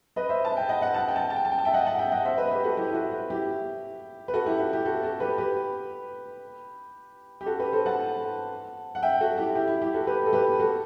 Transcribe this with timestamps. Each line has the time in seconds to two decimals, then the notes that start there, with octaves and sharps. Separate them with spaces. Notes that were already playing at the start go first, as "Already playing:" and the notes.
0.16 B4 D#5
0.29 C5 E5
0.45 A5
0.57 G5
0.69 D#5 F#5
0.81 D#5 F#5
0.94 F#5 A5
1.08 G5
1.16 A5
1.23 G5
1.30 A5
1.36 G5
1.45 A5
1.52 G5
1.58 A5
1.65 E5 G5
1.74 D#5 F#5
1.86 F#5 A5
1.99 E5 G5
2.12 D#5 F#5
2.25 C5 E5
2.38 B4 D#5
2.51 G4 B4
2.64 F#4 A4
2.77 E4 G4
2.90 E4
2.94 F#4
3.12 F#4
3.30 E4 G4
4.28 B4
4.34 F#4 A4
4.46 E4 G4
4.59 F#4
4.73 E4 G4
4.85 F#4 A4
5.03 F#4 A4
5.20 G4 B4
5.38 G4 B4
7.41 G4
7.46 F#4 A4
7.60 G4 B4
7.72 A4 C5
7.86 F#5 A5
8.95 F#5
9.02 E5 G5
9.20 F#4 A4
9.38 E4 G4
9.55 E4 G4
9.68 E4
9.82 E4 G4
9.94 F#4 A4
10.07 G4 B4
10.26 A4
10.33 G4 B4
10.60 F#4 A4